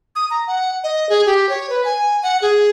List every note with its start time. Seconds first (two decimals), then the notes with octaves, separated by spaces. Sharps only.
0.16 D#6
0.31 A#5
0.47 F#5
0.84 D#5
1.09 G#4
1.26 G4
1.49 C#5
1.70 B4
1.85 G#5
2.23 F#5
2.42 G#4